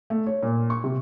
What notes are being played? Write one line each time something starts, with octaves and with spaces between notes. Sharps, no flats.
A3
C#5
A#2
C#6
C3